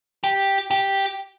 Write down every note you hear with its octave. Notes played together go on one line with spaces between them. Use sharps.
G4
G4